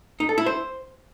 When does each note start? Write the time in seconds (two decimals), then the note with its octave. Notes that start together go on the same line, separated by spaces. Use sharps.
0.20 D#4
0.29 A4
0.38 E4
0.46 C5